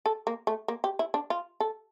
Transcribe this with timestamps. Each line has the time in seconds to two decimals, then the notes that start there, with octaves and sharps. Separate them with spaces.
0.06 A4
0.27 A#3
0.47 A3
0.68 A#3
0.84 G4
0.99 E4
1.14 D4
1.30 F4
1.60 A4